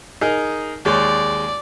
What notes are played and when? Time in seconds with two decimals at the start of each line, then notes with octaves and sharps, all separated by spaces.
0.21 D#4 G#4 A#4
0.85 D#2 G#3 C#5 D5